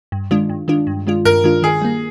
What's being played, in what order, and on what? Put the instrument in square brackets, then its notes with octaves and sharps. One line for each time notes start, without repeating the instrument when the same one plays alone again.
[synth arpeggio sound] G2
D#3 G#3 D4 F4
G2
D#3 G#3 D4 F4
G2
D#3 G#3 D4 F4
[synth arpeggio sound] G2 [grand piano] A#4
[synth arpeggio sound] D#3 G#3 D4 F4
[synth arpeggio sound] D#3 [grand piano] G#4
[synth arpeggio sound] G3 A#3